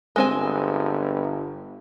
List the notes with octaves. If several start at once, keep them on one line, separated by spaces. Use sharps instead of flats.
G1 G#3 C4 G#5